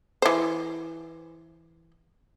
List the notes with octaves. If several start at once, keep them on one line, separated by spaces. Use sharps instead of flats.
E3 C5